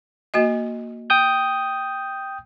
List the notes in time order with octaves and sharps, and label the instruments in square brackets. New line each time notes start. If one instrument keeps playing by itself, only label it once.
[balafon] A#3 F#4 D#5
[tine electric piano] G5 D#6 G6